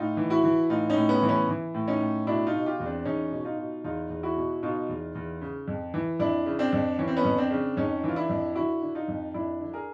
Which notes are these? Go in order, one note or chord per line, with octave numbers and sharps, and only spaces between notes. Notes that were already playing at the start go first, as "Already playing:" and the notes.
Already playing: A2 D#4 F4
E3
E4 F#4
E3
A2 D#4 F4
C#4 D#4
A2
B3 C#4
E3
B3 C#4
E3
A2
C#4 D#4
A2
B2 D4 E4
D#4 F4
B2
F4 G4
E2
C4 D4
E2 C#4 D#4
B2
D#4 F4
B2
E2 D#4 F4
E2
E4 F#4
B2
B2 D#4 F4
E2
E2
C#3
F2
E3
F2 D4 E4
C#3
C4 D4
F2
E3 C#4
C4
B3 C#4
F2
C4 D4
C#3
F2 C#4 D#4
E3
F4
D4 E4
F2
D3 E4 F#4
D3
D#4 F4
F2
F2 D4 E4
D3
G#4 A#4